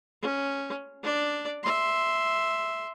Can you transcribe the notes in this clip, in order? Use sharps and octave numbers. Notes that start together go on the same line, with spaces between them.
C#4
D4 D5
E5 C6